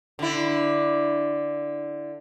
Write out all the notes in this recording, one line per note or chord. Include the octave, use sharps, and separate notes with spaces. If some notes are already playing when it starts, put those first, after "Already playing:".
D3 E4